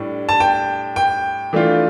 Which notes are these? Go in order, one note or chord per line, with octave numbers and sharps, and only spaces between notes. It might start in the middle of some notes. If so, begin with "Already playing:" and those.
Already playing: A2 G3 D4
A5
G5
G5
E3 A3 D4 F4